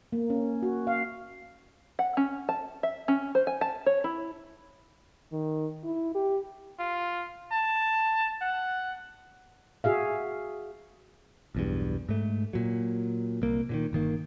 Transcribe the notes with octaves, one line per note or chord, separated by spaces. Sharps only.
A#3
C#4
F#4
F5
F#5
C#4
A5
E5
C#4
C5
G#5
A5
C#5
E4
D#3
E4
G4
F4
A5
F#5
F#4 G#4 E5 F5
B1 E2 G2
G#2 A3
A#2 F#3
C2 A#3
A#2 D3 D#3
G1 D#3 A#3